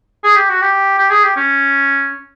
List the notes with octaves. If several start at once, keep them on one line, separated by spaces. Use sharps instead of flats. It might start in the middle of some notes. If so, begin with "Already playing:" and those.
G#4
G4
F#4
G4
G4
G#4
G4
C#4